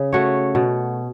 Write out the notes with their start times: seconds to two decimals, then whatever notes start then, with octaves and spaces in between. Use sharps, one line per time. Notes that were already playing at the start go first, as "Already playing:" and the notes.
Already playing: C#3
0.13 A3 F#4 C#5
0.55 B2